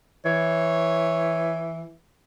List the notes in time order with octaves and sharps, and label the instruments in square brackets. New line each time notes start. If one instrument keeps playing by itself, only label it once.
[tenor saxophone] E3 [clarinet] C#5